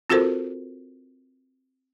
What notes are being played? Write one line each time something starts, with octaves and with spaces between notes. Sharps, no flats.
C4 F4 F#4 A4 A#4 C5